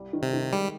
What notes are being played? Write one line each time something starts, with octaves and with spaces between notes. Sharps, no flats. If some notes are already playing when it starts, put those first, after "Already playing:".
Already playing: C2 G3
D#3
C3
D#3
G3 G#3